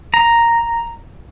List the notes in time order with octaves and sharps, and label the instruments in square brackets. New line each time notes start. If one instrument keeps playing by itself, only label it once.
[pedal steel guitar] A#5